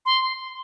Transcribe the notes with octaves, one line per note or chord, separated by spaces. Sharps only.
C6